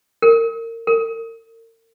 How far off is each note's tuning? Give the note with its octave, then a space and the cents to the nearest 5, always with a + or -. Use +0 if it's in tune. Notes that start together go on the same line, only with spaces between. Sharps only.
A#4 -30
A#4 -45